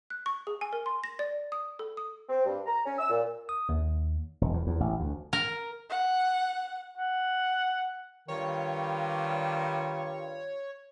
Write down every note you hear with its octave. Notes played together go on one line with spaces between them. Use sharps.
F#6
C#6
G#4
G#5
A#4
C6
A#6
D5
D#6
A4
D#6
C4
G2
A#5
C#4
E6
A#2
D#6
D#2
E1
E2
E2
A1
D2
A#4
F#5
F#5
G2 D#3 G3 F4 C#5